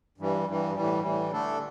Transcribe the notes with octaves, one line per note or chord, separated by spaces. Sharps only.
G2 E3 G3
G2 E3 G3
A2 E3 G3
A2 E3 G3
D3 A3 D4 A4